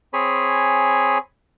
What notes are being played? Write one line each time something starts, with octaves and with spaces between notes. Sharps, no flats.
C4 G#4 C#5 G#5 B5